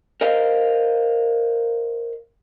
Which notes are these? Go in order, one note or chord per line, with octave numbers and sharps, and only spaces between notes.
A#4 C5 D#5 F5